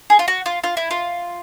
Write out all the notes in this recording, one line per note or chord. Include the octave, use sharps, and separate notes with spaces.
G#4
F4
F#4
F4
F4
E4
F4